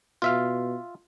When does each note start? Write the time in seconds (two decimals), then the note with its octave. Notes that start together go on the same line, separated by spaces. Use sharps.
0.22 B2 F4 E5 F5